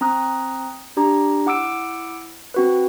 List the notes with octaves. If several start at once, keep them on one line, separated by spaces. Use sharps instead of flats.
C4 A#5 D#6 F#6
D4 G4 A#5
E4 F#5 D6 E6 D7
C4 F#4 B4